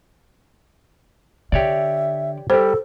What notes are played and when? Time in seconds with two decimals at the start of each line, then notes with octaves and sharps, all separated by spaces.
1.52 D3 G4 C#5 D5 E5
2.50 G3 G4 A4 C5